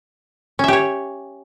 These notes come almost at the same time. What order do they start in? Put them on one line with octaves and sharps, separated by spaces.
C#4 E5 G4 C#5